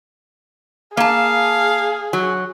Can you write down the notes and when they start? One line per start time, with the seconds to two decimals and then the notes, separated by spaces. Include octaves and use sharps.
0.97 A#3 G#4 F5 A5
2.13 F#3